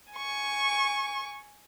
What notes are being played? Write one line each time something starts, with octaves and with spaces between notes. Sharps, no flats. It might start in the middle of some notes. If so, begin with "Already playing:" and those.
G#5 C#6